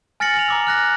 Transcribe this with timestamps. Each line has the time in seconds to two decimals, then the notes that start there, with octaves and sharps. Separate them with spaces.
0.20 G#5 F6 A6 A#6 C#7 F#7
0.36 F7 F#7
0.48 A#5 D6 E6
0.67 F6 F#6 A#6